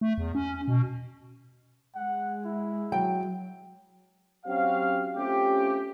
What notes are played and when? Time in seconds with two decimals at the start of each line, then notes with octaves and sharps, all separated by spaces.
0.01 A3
0.18 E2
0.35 C#4
0.68 B2
1.95 G#3 F#5
2.45 E4
2.92 F#3 G5
4.46 F#3 C4 C#4 F#4 G4 F5
5.16 A3 C4 C#4 F4 G4